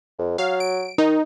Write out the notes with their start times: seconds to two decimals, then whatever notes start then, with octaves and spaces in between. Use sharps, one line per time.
0.19 F2
0.38 F#3 F5
0.60 D7
0.98 D#3 D#4